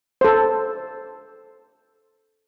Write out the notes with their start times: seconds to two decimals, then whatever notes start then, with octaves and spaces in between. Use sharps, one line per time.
0.21 A4 C5